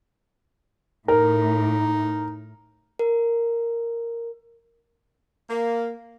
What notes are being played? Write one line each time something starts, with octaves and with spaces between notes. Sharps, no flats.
A2 D#4 A#4
A#4
A#3